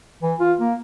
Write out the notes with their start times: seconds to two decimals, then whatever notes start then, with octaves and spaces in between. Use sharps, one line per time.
0.23 E3
0.40 F4
0.60 A#3